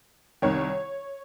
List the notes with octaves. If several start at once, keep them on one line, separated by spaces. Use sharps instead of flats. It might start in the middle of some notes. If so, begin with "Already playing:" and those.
C2 C3 D#3 C#5